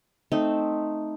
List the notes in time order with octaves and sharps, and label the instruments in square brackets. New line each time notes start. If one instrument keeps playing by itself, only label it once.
[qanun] A3 C4 D#4